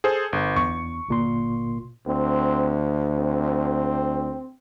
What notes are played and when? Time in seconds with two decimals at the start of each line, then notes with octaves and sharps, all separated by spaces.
0.04 G#4 A4 C5
0.33 G1
0.57 E2 C#6
1.09 G1 A#2 C6
2.07 D2 C4
3.17 C4